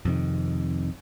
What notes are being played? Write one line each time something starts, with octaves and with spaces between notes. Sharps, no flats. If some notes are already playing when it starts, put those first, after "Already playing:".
F2 C3 D#3